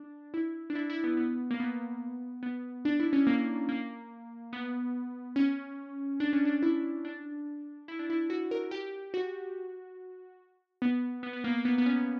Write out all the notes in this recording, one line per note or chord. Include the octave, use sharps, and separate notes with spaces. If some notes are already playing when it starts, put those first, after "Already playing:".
Already playing: D4
E4
D4
E4
E4
B3
B3
A#3
B3
B3
D4
E4
C#4
A#3
A#3
B3
C#4
D4
C#4
D4
E4
D4
E4
D4
E4
F#4
A#4
G4
F#4
B3
B3
B3
A#3
A#3
B3
B3
C#4